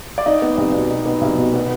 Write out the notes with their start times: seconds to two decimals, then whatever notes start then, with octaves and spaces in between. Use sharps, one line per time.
0.18 D5
0.26 D#4 D#5
0.42 B3
0.58 C2
0.74 B2
0.90 D#4
1.06 B3
1.21 C2
1.37 B2
1.54 B3